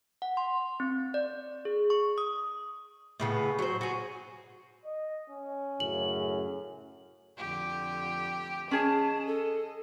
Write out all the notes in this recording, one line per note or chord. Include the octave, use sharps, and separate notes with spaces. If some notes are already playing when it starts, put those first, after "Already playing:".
F#5
C6
C4
D5
G#4
C#6
D#6
A2 C#3 B3
F#3 C5
F#4 G#4
D#5
C#4
F#2 A2 C#3 F#7
F2 D3 G4
C#4 G#4 D#5 A5
A4